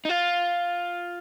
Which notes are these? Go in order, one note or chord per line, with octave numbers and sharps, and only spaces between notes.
D#4
F4